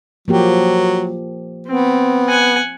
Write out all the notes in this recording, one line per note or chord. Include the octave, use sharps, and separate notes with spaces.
F3 F#3 A#3 G4
B3 C4
F#5 G#5